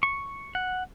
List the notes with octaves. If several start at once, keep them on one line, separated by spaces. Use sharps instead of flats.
C#6
F#5